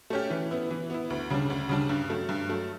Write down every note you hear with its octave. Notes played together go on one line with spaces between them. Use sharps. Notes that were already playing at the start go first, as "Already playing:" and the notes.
A3 C#4 G4
E3
B3 E4
E3
B3 E4
D2
C#3 G3 D4
D2
C#3 G3 D4
G2
F#3 A3
G2
F#3 A3